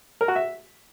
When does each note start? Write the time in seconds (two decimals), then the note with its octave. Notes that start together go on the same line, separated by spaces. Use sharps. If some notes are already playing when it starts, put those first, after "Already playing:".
0.21 A#4
0.28 F#4
0.36 E5